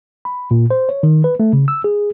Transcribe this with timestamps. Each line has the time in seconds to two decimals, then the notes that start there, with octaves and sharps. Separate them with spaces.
0.25 B5
0.51 A#2
0.71 C5
0.89 C#5
1.03 D#3
1.24 B4
1.40 A3
1.53 C#3
1.68 E6
1.84 G#4